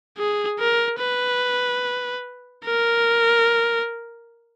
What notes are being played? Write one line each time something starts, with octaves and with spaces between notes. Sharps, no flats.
G#4
A#4
B4
A#4